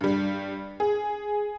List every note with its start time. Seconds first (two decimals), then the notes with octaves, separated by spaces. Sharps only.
0.01 G2 G3
0.80 G#4